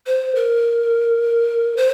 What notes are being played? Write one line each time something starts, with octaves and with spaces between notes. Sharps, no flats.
C5
A#4
C5